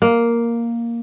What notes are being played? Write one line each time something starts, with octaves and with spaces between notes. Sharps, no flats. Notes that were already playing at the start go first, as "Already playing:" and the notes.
A#3